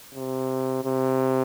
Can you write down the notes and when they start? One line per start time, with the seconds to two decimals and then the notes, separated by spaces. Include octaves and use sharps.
0.14 C3
0.84 C3